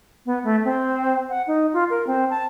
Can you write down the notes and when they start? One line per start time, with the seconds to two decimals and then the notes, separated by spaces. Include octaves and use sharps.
0.26 B3
0.44 A3
0.65 C4
1.30 F#5
1.47 D#4
1.73 F4
1.90 A#4
2.07 C4
2.30 A5